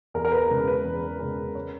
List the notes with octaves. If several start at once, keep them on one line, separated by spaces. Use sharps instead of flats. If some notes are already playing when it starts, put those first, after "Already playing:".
E2 A#4
A#4
B4
C#3 G#3 C#4
B4
E2
C#3 G#3 C#4
C#5